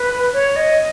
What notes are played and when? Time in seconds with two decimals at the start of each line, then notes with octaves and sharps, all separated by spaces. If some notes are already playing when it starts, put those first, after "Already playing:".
Already playing: B4
0.32 C#5
0.55 D#5